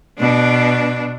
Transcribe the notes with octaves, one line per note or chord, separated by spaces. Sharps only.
B2 D4